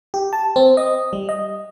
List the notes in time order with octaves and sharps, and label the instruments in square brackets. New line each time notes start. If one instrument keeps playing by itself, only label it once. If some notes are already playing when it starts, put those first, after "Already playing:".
[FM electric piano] G4
A5
C4
D#5
G3
D#5